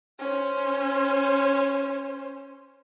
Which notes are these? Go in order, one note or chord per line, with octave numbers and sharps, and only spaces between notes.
C#4 C5